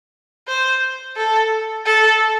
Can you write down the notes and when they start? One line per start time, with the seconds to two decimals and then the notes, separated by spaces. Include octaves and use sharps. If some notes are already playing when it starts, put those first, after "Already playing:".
0.48 C5
1.17 A4
1.86 A4